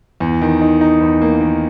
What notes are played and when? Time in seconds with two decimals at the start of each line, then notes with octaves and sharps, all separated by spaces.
0.20 E2
0.41 D#3
0.61 D#4
0.81 D#4
1.01 E2
1.22 A#3
1.41 D#3